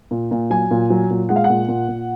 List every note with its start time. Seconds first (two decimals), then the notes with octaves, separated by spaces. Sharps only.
0.11 A#2
0.31 A#2
0.50 F#3 G#5
0.71 A#2
0.90 F#3
1.10 A#2
1.29 G#3 F#5
1.36 F5
1.44 F#5
1.50 A#2
1.68 A#2
1.88 A#2